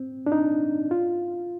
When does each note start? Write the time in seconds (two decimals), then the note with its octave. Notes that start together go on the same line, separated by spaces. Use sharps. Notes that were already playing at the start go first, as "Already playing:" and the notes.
Already playing: C4
0.26 D4
0.32 D#4
0.91 F4